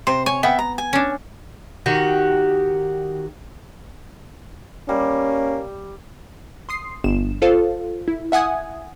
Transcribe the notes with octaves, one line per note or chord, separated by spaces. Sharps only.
C3 C5
C#5 G#5
B3 E5 F#5 G5
A#5
G#5
C#4 D4
D#3 F#4 G4
G3 A#3 C#4
C6 D#6 C7
G1 E7
F4 A4 C5 F5
E4
E5 F#5 G#5 D#6 G#6